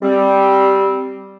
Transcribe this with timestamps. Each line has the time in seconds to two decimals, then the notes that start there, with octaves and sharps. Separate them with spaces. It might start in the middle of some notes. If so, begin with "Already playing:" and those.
0.02 G3 C4